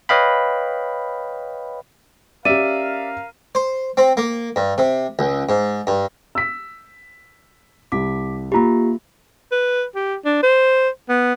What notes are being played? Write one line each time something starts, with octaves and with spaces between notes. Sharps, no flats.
B4 C#5 D#5 F5 G5 B5
C#4 G4 A#4 D5 E5 F5 D#7
C5
C4
A#3
G2
C3
C#2
G#2
G2
E6 B6
C2 D6 B6
A#3 F4 G4 A#5 B5
B4
G4
D4
C5
B3